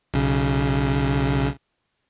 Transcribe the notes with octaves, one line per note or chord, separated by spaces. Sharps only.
B1 C#3